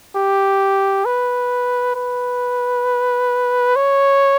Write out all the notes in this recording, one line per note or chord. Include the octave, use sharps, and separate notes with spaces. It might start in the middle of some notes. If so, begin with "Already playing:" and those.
G4
B4
B4
C#5